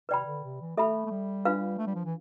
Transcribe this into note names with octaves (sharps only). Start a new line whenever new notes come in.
C3 B4 D5 G5 B5
D3
C3
E3
A3 A4 E5 B5
A3
G3
D4 F4 B4 F5
A3
G3
F3
E3